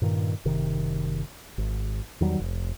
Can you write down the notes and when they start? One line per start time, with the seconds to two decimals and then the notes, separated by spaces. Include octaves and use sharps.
0.02 G2 A#2 D#3
0.45 F#1 C3 D#3
1.58 G#1
2.20 E2 D#3 F#3 G3
2.40 F1